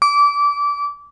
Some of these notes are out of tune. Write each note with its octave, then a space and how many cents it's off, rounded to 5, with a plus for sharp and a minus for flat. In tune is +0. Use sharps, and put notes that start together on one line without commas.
D6 -25